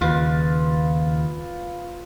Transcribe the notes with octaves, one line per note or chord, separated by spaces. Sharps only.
D#2 C#3 F4 B4